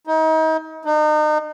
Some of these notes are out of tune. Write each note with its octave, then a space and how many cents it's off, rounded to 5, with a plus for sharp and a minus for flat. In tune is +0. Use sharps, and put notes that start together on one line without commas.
D#4 +35
D#4 -35